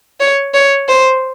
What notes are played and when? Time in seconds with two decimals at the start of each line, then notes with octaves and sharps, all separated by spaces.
0.20 C#5
0.54 C#5
0.89 C5